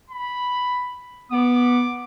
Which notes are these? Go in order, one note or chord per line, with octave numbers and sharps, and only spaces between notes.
B5
B3 D6